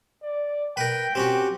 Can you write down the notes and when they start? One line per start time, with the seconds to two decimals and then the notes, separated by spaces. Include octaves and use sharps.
0.23 D5
0.77 A#4 B4 G5
1.15 C4 C#4 F#4 G4